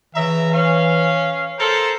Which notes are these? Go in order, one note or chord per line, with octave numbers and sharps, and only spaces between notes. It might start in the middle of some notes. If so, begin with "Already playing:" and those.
C#3 E3 E5 A#5
C#4 F5
A4 A#4 C5